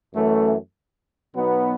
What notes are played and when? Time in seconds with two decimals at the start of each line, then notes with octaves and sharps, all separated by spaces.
0.13 F#2 E3 A3 C#4
1.34 B2 F#3 B3 D#4